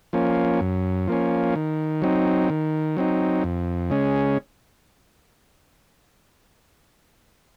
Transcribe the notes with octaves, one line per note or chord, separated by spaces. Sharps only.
F3 A#3 C#4
F#2
F3 A#3 C#4
D#3
F#3 C4 D#4
D#3
F#3 C4 D#4
F2
C#3 G#3 C#4